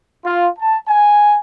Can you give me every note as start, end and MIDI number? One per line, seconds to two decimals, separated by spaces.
0.24 0.48 65
0.59 0.76 81
0.88 1.38 80